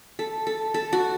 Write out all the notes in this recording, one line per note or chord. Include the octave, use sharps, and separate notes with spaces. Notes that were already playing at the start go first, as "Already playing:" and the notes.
A4
A4
A4
F#4